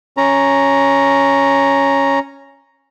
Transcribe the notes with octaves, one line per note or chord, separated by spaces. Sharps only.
C#4 A#5